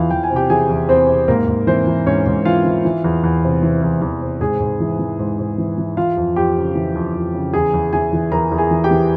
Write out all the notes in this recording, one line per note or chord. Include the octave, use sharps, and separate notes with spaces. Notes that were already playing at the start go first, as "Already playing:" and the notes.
Already playing: E2 E3 F4 F5
E2 G5
G#5
C3
G4 G5
E3 G#4 G#5
E2
E2 C4 C5
C3
G#2 A#3 A#4
G#2
E3 C4 C5
E3
G#2 C#4 C#5
G#2
E3 F4 F5
E3
E3
E2
E2
C3
E3
E2
E2
C3
G#2 G#4 G#5
G#2
E3
E3
G#2
G#2
E3
E3
E3 F4 F5
F2
F2 G4 G5
C#3
E3
F2
F2
C#3
E2 G#4 G#5
E2
E3 G#4 G#5
E3
E2 A#4 A#5
E2
G#4 G#5
E3
G4 G5
E3